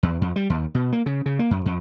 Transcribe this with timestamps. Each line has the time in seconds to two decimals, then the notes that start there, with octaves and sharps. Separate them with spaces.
0.03 E2
0.21 F2
0.36 G3
0.50 D#2
0.75 B2
0.92 A#3
1.06 C#3
1.26 C#3
1.39 A#3
1.51 F#2
1.66 F2